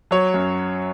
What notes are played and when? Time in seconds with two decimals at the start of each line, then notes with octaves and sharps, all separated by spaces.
0.11 F#3 C#5
0.34 F#2